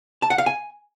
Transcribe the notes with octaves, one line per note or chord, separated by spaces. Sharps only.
A5
F#5
F5
G#5